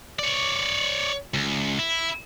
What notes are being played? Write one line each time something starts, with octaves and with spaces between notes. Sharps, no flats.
C#5 D5
C#2
E4